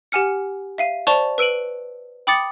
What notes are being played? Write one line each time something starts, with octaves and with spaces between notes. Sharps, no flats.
G4 F#5 G#5 F6 C#7
E5 F5 D#7
C5 D5 A5 C#6 F7 G7
B4 E6 D7 D#7 F#7
G5 B5 D6 D#6 A6 C#7